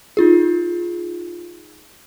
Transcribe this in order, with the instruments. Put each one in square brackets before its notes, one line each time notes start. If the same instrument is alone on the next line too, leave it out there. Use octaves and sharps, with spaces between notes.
[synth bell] D#4 F4 G#4